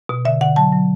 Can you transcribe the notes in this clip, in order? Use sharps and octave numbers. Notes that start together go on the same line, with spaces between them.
B2
D3 E5
D3 F#5
F#3 A5
F#3